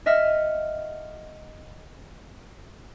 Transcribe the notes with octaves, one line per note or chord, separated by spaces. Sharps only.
D#5 E5 F#5 F6